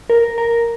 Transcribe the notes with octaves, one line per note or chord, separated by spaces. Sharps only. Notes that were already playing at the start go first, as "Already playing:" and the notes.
A#4
A#4